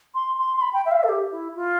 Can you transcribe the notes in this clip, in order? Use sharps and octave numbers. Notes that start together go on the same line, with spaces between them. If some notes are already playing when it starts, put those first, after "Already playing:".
C6
C6
C6
B5
G5
E5
F5
E5
A4
G4
E4
F4